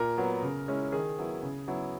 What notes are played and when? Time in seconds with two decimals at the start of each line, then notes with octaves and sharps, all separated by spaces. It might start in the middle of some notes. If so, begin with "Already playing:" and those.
Already playing: A#2 A#4
0.18 F#3 B3
0.42 C#3
0.68 G#3 C#4 E4
0.92 D#3 G#4
1.18 F#3 B3 E4
1.43 C#3
1.68 F#3 B3 E4